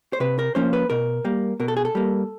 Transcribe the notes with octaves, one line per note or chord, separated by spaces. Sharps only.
C5
C3 B4
A#4
F3 A#3 C#4 C5
B4
B2 A#4
G3 A#3
B2 A#4
A4
G#4
A4
G3 A#3